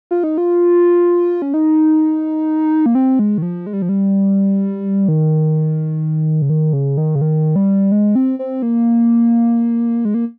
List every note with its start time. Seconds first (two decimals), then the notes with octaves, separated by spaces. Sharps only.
0.11 F4
0.24 D#4
0.38 F4
1.42 C#4
1.54 D#4
2.86 A#3
2.95 C4
3.19 G#3
3.38 D#3
3.42 F3
3.67 G#3
3.73 G3
3.82 F3
3.89 G3
5.08 D#3
6.42 C#3
6.50 D#3
6.73 C#3
6.97 D#3
7.15 C#3
7.21 D#3
7.56 G3
7.92 G#3
8.15 C4
8.39 C4
8.62 A#3
10.05 G#3
10.14 A#3